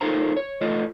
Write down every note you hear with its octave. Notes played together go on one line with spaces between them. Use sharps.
D#4 F4 A4 A#4 C5 A#5
C#5
A3 F4 A4 D#5